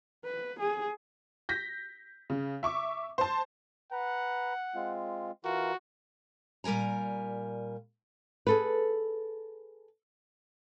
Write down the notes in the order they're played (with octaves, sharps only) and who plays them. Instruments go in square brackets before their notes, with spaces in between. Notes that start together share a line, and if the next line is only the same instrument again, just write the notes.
[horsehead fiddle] B4
G#4
[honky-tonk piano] G6 A#6 B6
C#3
E5 C#6 D6
C5 A5
[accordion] B4 A#5 [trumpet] F#5
[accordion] G#3 C4 F4
[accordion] E3 F4 A#4 [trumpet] F#4
[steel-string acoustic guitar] A#2 G3 A#4 G#5 A#5
[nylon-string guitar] G#4 A4 B4